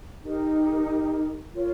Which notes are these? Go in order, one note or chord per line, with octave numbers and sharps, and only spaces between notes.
D#4 G4 A#4
F4 A#4 C#5